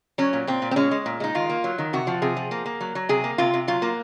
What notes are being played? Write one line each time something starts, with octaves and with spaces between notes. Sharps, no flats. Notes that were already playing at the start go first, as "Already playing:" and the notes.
F#3 C#4
A#2
A#2 C4
A#2
C4
G#3 C#4
G#3
A#2
G#3 D#4
D#3 F4
A#3
F#3
D#3
C3 F#4
F3
C3 G#4
F3
A#3
A#3
F#3
F#3
C3 G#4
A#3
C3 F4
C3
F#3 F4
A#3